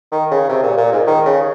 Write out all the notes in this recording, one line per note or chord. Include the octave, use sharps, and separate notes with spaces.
D#3
C#3
C3
A#2
A#2
G#2
D#3
C#3